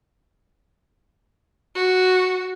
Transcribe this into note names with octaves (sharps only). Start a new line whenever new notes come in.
F#4